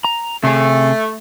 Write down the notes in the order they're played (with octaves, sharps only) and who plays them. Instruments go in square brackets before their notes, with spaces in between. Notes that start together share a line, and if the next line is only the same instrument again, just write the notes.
[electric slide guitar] A#5
[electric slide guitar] C3 G#4 [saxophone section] A3